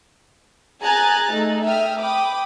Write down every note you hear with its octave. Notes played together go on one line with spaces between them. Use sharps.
G#4 G#5 A#5 F#6 A6
A3 D#4
E5 G5 D#6 F6
G5 B5 D6 D#6